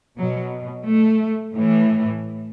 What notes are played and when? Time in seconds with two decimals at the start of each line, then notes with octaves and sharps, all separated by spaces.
0.17 B2 F#3
0.86 A3
1.55 A2 E3